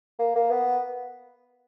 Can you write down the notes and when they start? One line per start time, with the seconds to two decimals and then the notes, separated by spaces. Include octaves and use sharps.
0.19 A#3
0.35 A#3
0.51 B3